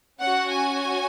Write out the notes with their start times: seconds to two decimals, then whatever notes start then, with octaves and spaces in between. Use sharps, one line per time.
0.20 C#4 F#4 F#5
0.52 G#5